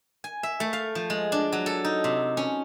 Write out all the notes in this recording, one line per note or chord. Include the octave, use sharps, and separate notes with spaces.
G#5
E5
A3
F5
F3
G#3
D4
F#3
A4
D#4
C3
C#4